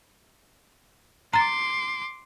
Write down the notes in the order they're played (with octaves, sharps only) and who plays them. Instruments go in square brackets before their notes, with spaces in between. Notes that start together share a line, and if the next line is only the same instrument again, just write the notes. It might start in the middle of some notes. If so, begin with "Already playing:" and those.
[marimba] A#5 A6 [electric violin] C6 D6